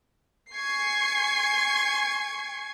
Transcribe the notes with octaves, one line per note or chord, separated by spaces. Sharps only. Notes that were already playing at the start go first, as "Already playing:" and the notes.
G#5 C#6 G#6 C7